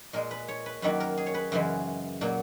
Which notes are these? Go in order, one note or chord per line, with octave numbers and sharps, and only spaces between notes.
A#2 G#3 A#4
B4
C#5
B4
F#2 D#3 F#3 A#3 B4
A#4
G#4
C#5
B4
F#2 C#3 E3 G#3
A#2 F#3 A#3